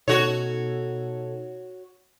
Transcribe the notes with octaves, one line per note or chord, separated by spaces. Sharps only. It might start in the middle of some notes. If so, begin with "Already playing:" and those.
B2 D#4 F#4 A4 C#5